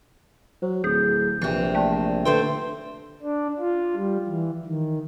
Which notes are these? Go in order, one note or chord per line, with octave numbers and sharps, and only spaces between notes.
F#3 C5
D1 G#4 G6
A#1 C3 E3 C#6
A3 D5 G5 A5
D3 A3 B4 C5 G5 C6
D4
F4
G3
E3
D#3